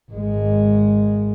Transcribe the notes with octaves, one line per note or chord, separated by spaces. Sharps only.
G#1 G#3